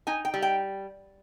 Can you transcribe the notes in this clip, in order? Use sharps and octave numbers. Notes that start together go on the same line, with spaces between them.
D#4 G#5
G5
G3
G5